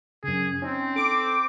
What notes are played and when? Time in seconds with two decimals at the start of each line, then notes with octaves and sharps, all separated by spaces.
0.24 F#2 C#3 G#4
0.62 C4 C#4 D#4
0.96 A4 D6